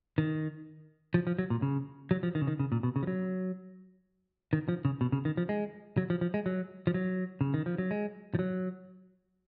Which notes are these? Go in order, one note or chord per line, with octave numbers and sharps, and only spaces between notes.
D#3
F3
F3
F#3
A#2
C#3
F#3
F3
D#3
C#3
D#3
C#3
A#2
B2
C#3
F3
F#3
D#3
F3
C#3
B2
C#3
D#3
F3
G#3
F#3
F3
F3
G#3
F#3
F3
F#3
C#3
D#3
F3
F#3
G#3
F3
F#3